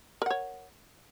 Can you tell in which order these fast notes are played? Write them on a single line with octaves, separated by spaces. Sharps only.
A#4 F#5 C#5